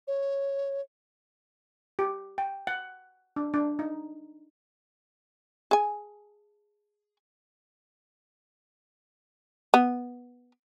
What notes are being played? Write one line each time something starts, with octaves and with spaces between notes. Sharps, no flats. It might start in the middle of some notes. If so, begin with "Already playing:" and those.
C#5
G4
G5
F#5
D4
D4
D#4
G#4 G#5
B3